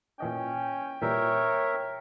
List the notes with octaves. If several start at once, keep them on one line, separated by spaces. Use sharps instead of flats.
A#2 E3 C#4 D#5 G5
A#2 E3 G3 A#4 C#5 E5